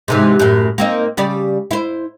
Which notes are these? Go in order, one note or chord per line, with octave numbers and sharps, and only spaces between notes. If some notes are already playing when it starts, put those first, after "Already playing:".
G#2 C3 E3
F#2 A2
A#3 C4 D#4
C#3 G3 D5
E4 C5